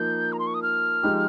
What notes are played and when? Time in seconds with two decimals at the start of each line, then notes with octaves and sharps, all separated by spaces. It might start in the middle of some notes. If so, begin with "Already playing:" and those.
Already playing: F3 A#3 D#4 G6
0.33 A#5
0.39 C6
0.47 C#6
0.54 D#6
0.62 F6
1.03 F3 G#3 D#4 G4